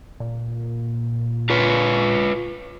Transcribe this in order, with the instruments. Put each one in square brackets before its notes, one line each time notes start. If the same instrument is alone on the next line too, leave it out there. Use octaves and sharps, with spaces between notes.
[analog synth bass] A#2
[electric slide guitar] F4 B4 C#5